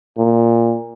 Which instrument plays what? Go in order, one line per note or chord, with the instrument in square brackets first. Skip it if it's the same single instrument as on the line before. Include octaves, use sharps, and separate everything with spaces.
[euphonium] A#2